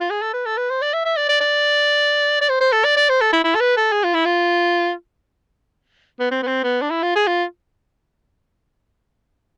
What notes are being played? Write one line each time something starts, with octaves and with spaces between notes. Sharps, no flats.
F4
G#4
A4
B4
A4
B4
C5
D5
E5
E5
D5
D5
D5
D5
C5
C5
A4
D5
D5
C5
A4
E4
E4
A4
B4
A4
G#4
F4
E4
F4
B3
C4
B3
C4
B3
D4
E4
F4
G#4
F4